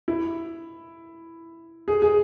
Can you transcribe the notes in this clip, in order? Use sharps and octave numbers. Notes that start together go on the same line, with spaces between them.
E4
G#4
G#4